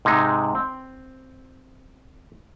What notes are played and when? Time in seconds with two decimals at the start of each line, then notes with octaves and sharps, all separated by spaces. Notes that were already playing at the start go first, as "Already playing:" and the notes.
0.05 G#2 C3 G#3 D#4
0.55 C4